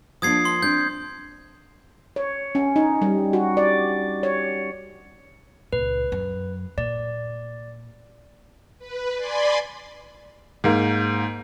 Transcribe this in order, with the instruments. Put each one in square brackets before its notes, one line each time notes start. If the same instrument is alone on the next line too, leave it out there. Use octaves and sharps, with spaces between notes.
[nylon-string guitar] F3 A#3 D4 [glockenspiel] D#6 G#6 C7
[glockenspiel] C6
[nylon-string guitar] C4 D4 [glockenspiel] G6
[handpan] C#5
C#4
D#4
G3
F#4
D5
C#5
[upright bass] C#2 A#2 [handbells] B4
[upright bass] F#2
[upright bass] A#2 [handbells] D5
[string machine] B4
D5 G#5 B5 C6
[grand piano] G#2 A#3